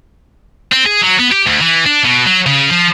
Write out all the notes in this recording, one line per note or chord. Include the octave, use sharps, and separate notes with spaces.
C4
G#4
F#3
B3
G4
D2
E3
D4
B2
F#3
C#3
F3